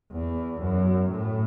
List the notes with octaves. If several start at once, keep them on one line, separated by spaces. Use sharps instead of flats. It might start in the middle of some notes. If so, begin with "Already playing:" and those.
E2
F#2
A2